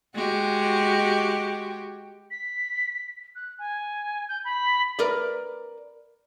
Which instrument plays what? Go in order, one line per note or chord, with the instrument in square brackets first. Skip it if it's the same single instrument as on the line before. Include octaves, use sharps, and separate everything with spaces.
[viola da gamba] G#3 F#4 G4
[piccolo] B6
F#6
G#5
G6
B5
[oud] A#4 B4 D5